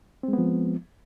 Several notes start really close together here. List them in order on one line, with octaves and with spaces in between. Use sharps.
C4 G#3 B3 F3